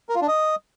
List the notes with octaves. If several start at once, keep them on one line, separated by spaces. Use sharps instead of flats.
A#4
F4
D4
D#5